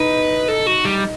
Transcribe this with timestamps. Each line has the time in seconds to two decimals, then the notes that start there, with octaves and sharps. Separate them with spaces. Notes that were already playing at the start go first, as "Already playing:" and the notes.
Already playing: D#4 B4
0.48 A4
0.67 F#4
0.85 G3